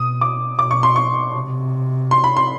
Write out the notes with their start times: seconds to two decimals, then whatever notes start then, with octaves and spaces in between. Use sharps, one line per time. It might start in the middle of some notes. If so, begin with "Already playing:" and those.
Already playing: B2 D#6
0.21 D6
0.59 B2 D6
0.71 C#6
0.83 C6
0.96 C#6
1.35 C3
2.11 C6
2.24 B5
2.37 C6